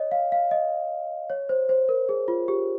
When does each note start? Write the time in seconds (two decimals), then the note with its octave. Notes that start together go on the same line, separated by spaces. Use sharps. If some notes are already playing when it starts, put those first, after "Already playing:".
Already playing: C#5 D#5
0.12 F5
0.32 F5
0.51 D#5
1.30 C#5
1.49 C5
1.69 C5
1.89 A#4
2.09 G#4
2.28 F4
2.48 G4